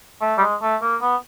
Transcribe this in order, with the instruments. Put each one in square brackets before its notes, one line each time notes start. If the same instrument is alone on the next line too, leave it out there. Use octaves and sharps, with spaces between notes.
[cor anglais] A3
G3
G#3
A3
A#3
B3